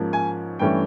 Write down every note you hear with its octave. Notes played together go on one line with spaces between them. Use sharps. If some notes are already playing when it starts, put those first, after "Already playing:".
Already playing: G#2 F3 A#3 C#4
G#5
G2 E3 A3 C#4 G5